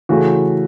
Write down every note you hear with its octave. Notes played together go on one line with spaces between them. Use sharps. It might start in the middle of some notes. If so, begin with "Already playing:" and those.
C#3 E3 A3 F#4